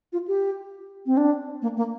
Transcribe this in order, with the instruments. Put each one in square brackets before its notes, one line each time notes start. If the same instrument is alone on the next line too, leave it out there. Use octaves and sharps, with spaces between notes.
[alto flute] F4
G4
C4
D4
A#3
A#3